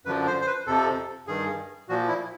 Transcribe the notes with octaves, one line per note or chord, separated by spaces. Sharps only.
F#2 D3 F3 B4
C5
C5
B4
F2 C3 F3 A4
G2 D#3 G#4
A#2 F3 F#4
E4